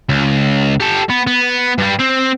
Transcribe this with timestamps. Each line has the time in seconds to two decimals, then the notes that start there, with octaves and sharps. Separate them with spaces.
0.09 C#2
0.80 G4 A4
1.10 B3
1.27 B3
1.78 G2 G3
1.99 C4